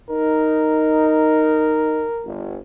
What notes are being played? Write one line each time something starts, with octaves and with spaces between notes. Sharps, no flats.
D#4 A#4
G1